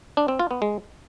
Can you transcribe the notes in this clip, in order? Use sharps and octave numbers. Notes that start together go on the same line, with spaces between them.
D4
C4
F4
B3
G#3